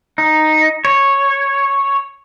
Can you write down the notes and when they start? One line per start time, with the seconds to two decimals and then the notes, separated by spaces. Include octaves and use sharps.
0.18 D#4
0.85 C#5